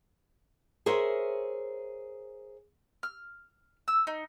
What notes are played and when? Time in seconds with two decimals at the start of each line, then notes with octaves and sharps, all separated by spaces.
0.86 G#4 A#4 C5 C#5 E5
3.03 F6
3.88 E6
4.07 D#4